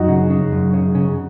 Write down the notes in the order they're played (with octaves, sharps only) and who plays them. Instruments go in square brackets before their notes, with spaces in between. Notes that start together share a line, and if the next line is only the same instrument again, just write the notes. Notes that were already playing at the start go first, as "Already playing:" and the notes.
Already playing: [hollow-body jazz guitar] F#2 [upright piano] D#4 F#4
[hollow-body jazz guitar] C#3
C#3
F#2
C#3
C#3